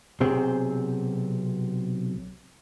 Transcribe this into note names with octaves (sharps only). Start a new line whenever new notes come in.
B1 C3 C4 G#4